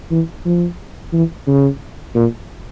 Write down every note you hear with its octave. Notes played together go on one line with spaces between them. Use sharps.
E3
F3
E3
C#3
A#2